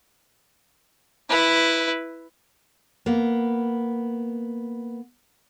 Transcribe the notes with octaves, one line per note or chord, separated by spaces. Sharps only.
E4 B4
A#3 B3